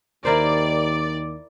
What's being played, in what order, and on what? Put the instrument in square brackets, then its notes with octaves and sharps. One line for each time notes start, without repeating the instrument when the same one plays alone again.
[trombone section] D#2 D#3 [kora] E4 A#4 C5 [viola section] D5